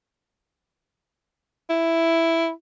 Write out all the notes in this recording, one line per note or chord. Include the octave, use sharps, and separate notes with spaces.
E4